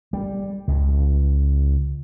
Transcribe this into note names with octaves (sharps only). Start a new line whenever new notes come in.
G3
C#2